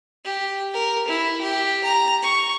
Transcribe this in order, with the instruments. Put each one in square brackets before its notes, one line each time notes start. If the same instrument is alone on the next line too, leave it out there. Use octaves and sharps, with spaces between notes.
[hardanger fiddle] G4
A#4
E4
G4
A#5
C#6